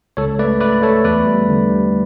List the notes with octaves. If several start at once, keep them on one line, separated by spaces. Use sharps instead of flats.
C#2 A4 C#5
A3 B4 D5
A3 B4 D5
A3 A4 C#5
E2 B4 D5
G3
D3
G3